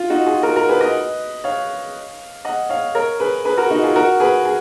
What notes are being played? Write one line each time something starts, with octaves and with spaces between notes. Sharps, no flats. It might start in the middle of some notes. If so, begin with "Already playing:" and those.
Already playing: F4
D#4 F#4
F4 G#4
F#4 A#4
F#4 A#4
G#4 B4
B4 D#5
C#5 F5
D#5 F#5
C#5 F5
A#4 C#5
G#4 B4
G#4 B4
F#4 A#4
D#4 F#4
F4 G#4
F#4 A#4
G#4 B4
G#4